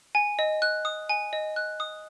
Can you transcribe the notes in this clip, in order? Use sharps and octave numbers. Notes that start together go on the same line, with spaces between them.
G#5
D#5
F#6
D#6
G#5
D#5
F#6
D#6